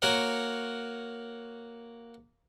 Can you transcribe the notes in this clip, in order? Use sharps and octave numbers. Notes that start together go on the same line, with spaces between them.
A#3 F#4 A#4 C#5 F#5